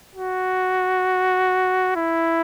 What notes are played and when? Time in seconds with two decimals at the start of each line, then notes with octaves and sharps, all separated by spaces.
0.15 F#4
1.96 E4